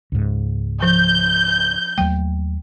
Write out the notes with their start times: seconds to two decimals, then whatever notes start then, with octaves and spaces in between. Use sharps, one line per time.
0.12 C#2 G#2
0.82 F3 G6
1.98 D#2 F#3 A3 G5